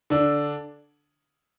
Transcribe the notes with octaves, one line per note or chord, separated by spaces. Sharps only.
D3 D4